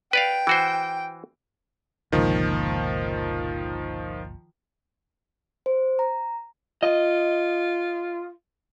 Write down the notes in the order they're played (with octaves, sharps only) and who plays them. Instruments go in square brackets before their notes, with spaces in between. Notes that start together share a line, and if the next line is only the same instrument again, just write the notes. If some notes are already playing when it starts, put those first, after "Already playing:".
[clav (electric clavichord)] B4 D5 F5 [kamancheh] G5
[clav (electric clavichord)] E3 F#4 C5
[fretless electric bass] G1 C#2 A#2 [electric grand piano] D#3 F3
[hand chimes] C5
A#5
[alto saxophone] F4 [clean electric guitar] D#5